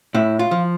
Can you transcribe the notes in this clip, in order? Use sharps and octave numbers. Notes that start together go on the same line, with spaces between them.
A2 E4
F4
F3